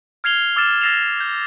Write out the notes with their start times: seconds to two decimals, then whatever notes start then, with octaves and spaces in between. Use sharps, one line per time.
0.24 F6 G#6 C7 F7 G7
0.56 D6 E6 F6 A6 E7
0.82 E6 A6 A#6 C7 E7 F7
1.20 G6